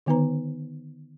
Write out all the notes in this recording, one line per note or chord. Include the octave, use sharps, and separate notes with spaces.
D3 D#3 B3 D#4 B4 A#5